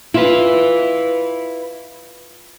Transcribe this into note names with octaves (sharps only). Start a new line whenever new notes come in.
E4 F4 B4